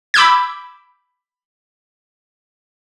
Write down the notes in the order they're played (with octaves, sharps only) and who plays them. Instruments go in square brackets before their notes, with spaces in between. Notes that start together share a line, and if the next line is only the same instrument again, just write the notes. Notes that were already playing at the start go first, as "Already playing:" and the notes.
[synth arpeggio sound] B5 D6 E6 G6 G#6